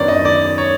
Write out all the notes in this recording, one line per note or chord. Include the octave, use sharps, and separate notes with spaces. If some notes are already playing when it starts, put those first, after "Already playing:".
Already playing: F#2 D#3 F#3 B3 D4 C#5 D5
D#5
D5
C#5